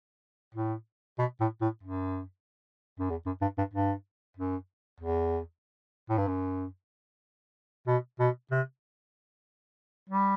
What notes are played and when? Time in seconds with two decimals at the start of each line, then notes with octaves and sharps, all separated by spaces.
0.55 A2
1.19 B2
1.40 A2
1.61 A2
1.83 F#2
2.99 F#2
3.10 E2
3.26 F#2
3.41 G2
3.58 G2
3.73 G2
4.37 F#2
5.00 E2
6.09 A2
6.18 G2
6.27 F#2
7.87 B2
8.19 B2
8.51 C3
10.09 G3